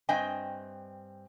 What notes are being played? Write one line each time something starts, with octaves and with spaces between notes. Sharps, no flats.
G2 C4 D#5 G5 G#5